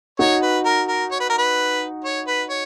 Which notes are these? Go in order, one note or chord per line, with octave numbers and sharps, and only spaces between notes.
D#4 F#4 C#5
B4
A#4
A#4
C#5
B4
A#4
B4
C#5
B4
C#5